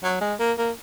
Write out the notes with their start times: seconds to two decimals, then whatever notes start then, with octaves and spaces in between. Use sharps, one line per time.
0.03 F#3
0.21 G#3
0.40 A#3
0.58 A#3